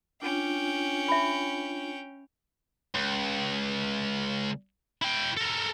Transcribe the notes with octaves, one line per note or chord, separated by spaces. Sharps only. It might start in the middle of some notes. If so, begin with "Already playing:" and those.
C#4 D4 F4 G5
E5 B5
C#2
E4 G5
A4 A#4